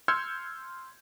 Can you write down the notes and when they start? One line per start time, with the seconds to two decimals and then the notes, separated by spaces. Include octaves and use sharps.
0.08 C6 E6 F6 G6 G#6 C#7